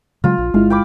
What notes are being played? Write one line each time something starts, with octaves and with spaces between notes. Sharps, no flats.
C#3 F#3 G#3 F4
A#1
G1 G#3 E4 F4 F5
G5 B5 D6